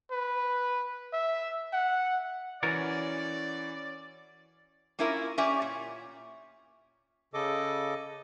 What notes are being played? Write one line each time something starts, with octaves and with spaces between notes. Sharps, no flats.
B4
E5
F#5
E3 C#4 F#4 A#4 D5 A6
A#3 C#4 E4 F4 A#4
C#4 G4 D5 E5 G#5
A#2
C#3 A4 D#5 D6